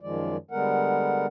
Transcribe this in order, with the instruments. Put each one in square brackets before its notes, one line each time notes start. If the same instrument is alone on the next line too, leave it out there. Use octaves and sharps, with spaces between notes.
[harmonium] F#2 D#3 F3 G#3 D5
D3 G3 G#3 B3 A#4 F#5